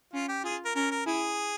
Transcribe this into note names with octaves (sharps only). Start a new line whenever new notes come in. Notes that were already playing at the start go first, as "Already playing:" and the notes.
C#4 F4
G4
F4 G#4
A#4
C#4 A#4
A#4
E4 G#4